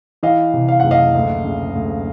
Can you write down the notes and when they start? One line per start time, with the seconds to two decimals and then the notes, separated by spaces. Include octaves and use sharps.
0.23 E3 D#5 F5
0.54 C3
0.68 F5
0.80 F#1 F#5
0.91 D#5 F5
1.15 D2
1.45 C#3
1.75 D2